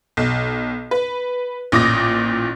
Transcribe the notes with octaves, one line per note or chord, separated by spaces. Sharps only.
B1
B4
A1 A#2 D6 D#6 A#6